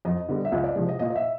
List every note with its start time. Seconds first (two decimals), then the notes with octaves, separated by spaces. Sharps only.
0.05 F2 D#5
0.29 D3 G3 B3
0.45 E5
0.52 C#2 D#5
0.64 D5
0.76 C3 F3 G#3 D#5
0.89 D#5
0.99 A#2 D#5
1.10 D#5
1.16 E5